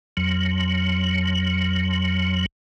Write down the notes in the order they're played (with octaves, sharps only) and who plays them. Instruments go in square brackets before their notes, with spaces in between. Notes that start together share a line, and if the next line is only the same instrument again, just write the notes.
[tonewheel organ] F2 F#3